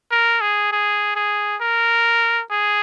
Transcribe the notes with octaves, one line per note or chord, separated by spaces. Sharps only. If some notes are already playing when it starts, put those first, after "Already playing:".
A#4
G#4
G#4
G#4
A#4
G#4